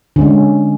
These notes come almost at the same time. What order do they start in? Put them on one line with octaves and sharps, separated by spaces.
D3 C#4 G#3